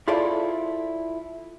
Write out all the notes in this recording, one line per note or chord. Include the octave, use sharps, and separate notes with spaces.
E4 F4 G#4 A4 C5 D5